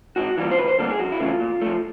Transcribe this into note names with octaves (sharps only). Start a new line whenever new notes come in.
G#2 F#4
E3 G3 A#3 F4
C5
D2 B4
C5
D3 G3 A#3 A4
G#4
F2 F#4
E4
C#3 E3 A3 F4
A#2
F3 A3